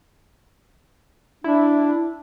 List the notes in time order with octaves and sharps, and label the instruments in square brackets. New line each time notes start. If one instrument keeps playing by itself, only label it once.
[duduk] D4 [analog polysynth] E4